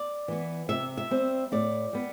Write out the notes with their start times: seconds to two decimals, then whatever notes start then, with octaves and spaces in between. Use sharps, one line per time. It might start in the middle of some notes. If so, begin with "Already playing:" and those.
Already playing: D5
0.28 E3 B3
0.69 C3 E5
0.97 E5
1.11 G3 C4
1.52 A2 D5
1.93 G3 B3